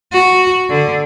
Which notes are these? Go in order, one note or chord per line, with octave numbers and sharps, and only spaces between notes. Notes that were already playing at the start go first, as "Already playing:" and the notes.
F#4
D3